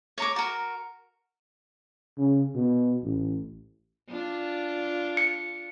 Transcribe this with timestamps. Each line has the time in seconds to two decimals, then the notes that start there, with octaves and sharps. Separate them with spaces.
0.18 C#5 A#5 D6
0.36 F#4 A#4
2.18 C#3
2.55 B2
3.03 A1
4.09 D4 F4
5.17 C#7